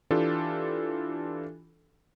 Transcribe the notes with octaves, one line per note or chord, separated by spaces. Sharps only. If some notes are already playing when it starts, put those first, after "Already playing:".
E3 D4 F4 G4 A4